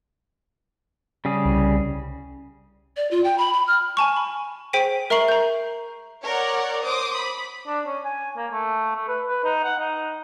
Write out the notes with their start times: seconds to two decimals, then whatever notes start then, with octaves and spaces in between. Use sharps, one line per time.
1.25 C#3 G3 G#4
1.45 C2
2.97 D5
3.11 F4
3.24 G5
3.38 B5
3.53 B5
3.67 F6
3.97 G#5 A5 C#6
4.17 B5
4.73 G#4 C5 G5 B6 D7 D#7
5.10 A#4 E5 A#5 C#6 C7 F#7
5.28 A#5 G6
6.23 A#4 C#5 D5 F#5
6.83 C5 D6 D#6
7.16 B5
7.67 D4
7.87 C#4
8.05 G#5
8.37 A#3
8.53 A3
8.96 A3
9.08 B4
9.28 B4
9.45 D#4
9.64 F#5
9.79 D#4